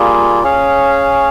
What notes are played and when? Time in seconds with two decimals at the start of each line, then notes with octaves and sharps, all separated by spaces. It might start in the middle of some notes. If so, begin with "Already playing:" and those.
Already playing: G3 A#3 F4 G#4
0.43 C#4 G#4 C#5 F5